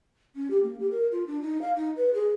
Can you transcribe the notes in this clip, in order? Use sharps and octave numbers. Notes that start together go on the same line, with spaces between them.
C#4
G4
A#3
G4
A#4
F4
D4
D#4
F5
D#4
B4
G#4